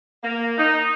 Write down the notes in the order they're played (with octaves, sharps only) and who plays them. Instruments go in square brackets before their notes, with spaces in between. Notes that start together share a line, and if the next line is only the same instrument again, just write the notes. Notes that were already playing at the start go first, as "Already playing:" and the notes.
[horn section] A#3
D#4